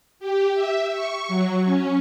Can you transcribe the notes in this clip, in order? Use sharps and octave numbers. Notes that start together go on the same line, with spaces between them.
G4
E5
C#6
F#3
C#4